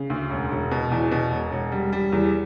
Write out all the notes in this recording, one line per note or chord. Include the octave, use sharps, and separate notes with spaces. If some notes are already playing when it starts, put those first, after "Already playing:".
Already playing: C#3
D2
E1
E1
B2
E2
B2
E1
E1
G3
G3
E2